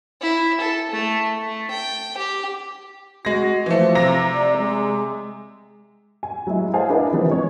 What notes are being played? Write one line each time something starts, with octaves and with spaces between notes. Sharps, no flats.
E4
A4
A3
A3
G5
G4
G#3 F#4 A#6
E3 F3 A3
C3 A#5 A#6
D5
G#3
G#5
F#3 G#3 E4
G#4 C5 F5 F#5 G#5 A5
D4 E4 G#4 A#4 B4 D#5
C3 E3 F3 B3
G#3 C#5